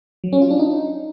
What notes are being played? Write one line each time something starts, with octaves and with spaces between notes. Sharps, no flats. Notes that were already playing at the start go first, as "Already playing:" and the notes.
F#3
C#4
F4
D4
D#4